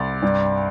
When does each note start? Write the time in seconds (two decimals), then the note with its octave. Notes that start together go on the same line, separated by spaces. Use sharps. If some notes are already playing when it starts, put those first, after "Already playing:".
Already playing: C2 D5
0.22 G2